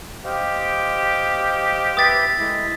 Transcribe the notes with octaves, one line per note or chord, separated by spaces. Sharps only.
G4 C5 D#5 F5
B4 E5 G5 D#6 A6 B6
G#3 A3 E4